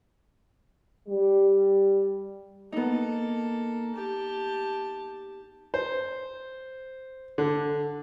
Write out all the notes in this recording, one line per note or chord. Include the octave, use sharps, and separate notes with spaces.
G3
A#3 B3 D#4 A4
G4 A5
C5
D3